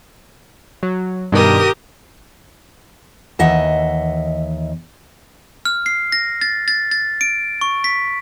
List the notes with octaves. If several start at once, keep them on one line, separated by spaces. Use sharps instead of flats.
F#3
G2 B2 D#3 G4 A#4 D#6
D#2 E3 D#5 E5 F#5
F6
C7
A#6
A6
A6
A6
D7
C#6
B6